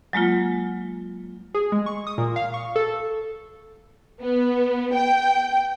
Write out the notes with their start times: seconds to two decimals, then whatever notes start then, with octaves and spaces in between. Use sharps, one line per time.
0.13 F#3 G#3 A#3 F4
1.55 G#4
1.72 G#3
1.86 C#6
2.07 D#6
2.18 A#2
2.36 F5
2.54 C#6
2.76 A4
4.21 B3
4.94 G5